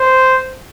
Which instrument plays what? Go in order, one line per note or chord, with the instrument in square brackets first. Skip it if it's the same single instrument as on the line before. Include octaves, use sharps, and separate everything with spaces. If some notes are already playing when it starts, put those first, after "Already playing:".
Already playing: [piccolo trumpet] C5